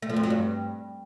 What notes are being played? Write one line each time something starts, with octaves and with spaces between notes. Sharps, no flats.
A3
F3
F2
F#3
G2